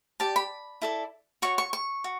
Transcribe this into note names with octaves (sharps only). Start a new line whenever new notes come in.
G4 D5 A5
B5
E4 A4 D5
F#4 C#5 C#6
C#6
C#6
F#4